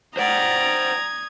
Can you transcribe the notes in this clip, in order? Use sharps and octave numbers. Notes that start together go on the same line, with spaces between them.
C5 D5 F#5 G5 A#5 D#6 G#6